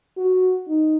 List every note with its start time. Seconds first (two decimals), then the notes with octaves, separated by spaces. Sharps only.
0.17 F#4
0.68 D#4